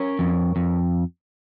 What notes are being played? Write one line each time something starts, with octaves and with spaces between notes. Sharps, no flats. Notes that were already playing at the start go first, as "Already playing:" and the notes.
Already playing: C#4 A#4 C#5
F2
F2